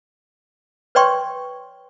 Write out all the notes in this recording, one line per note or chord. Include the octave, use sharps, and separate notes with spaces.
B4 C#5 D5 G5 C6 C#6